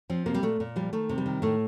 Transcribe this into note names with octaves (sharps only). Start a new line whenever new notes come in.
F3 C4
C3 A#3
G3
A#2 A3
A#2
F3 G3
D#3 A3
C3
G3
D#3
A2 A3